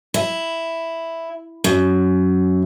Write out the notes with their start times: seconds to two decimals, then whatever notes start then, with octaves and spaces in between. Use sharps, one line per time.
0.14 E4
1.64 F#2